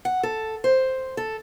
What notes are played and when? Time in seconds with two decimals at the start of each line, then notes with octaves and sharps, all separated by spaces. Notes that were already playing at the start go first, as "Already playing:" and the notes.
0.05 F#5
0.23 A4
0.64 C5
1.17 A4